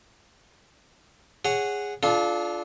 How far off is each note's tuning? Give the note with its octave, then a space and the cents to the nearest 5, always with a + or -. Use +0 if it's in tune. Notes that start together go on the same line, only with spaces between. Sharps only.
G#4 -10 C#5 +0 F#5 +0
D4 +0 F4 +0 A4 -40